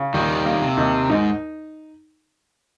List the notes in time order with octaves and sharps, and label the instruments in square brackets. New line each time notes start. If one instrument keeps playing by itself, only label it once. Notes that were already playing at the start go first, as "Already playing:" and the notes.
Already playing: [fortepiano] C#3
[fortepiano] D#2 [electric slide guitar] D#3 G3
[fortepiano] A#3
[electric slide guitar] C3
[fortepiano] D#2
[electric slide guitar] G#2 [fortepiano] D#4